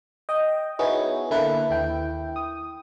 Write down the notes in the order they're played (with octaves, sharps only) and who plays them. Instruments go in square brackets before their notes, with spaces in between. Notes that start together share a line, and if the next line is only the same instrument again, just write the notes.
[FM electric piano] D#5 G5
B3 D#4 E4 F#4 G#4 C#5
D3 A#3 E4 A4 B4
D#2 E4 G5
D#6